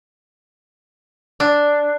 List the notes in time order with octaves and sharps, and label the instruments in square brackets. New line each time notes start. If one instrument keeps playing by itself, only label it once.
[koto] D4